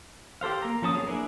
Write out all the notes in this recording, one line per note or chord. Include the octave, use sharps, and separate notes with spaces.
G4 A4 C5 F5
A#3 A#5
F3 C#4 A5 D#6
A#3 C4 G#4 C#5
A#3 B3 D4 E4 G#4